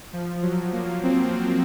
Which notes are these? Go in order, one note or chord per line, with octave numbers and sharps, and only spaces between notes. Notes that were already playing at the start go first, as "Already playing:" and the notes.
F3
F#3
A#3
C4